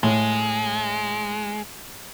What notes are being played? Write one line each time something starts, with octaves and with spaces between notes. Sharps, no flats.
A2 G#3